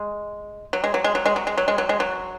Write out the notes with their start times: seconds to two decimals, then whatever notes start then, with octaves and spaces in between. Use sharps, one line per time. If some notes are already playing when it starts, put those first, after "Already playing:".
Already playing: G#3
0.73 F#3
0.84 G#3
0.94 F#3
1.04 G#3
1.15 F#3
1.26 G#3
1.36 F#3
1.47 G#3
1.58 F#3
1.68 G#3
1.78 F#3
1.89 G#3
2.00 F#3